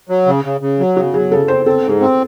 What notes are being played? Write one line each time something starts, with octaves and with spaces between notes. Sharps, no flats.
F#3
C#3
C#3
C#3
F#3
C#3 F#4
F#3 G#4
C#3 A4
C4 C5
C4 A4
G#2
G#4
C4